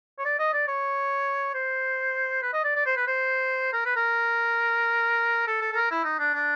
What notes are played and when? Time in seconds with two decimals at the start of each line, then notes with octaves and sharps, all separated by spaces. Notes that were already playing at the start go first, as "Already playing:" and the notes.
0.19 C#5
0.25 D5
0.39 D#5
0.53 D5
0.68 C#5
1.54 C5
2.42 B4
2.53 D#5
2.64 D5
2.75 D5
2.86 C5
2.96 B4
3.07 C5
3.73 A#4
3.85 B4
3.96 A#4
5.47 A4
5.61 A4
5.72 A4
5.75 A#4
5.91 E4
6.04 D#4
6.19 D4
6.34 D4